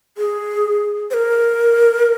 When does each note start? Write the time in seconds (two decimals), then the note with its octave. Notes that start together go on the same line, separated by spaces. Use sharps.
0.17 G#4
1.10 C5
1.14 A#4